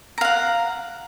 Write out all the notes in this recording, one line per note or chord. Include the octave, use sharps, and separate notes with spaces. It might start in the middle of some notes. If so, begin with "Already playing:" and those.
F5 F#5 A#5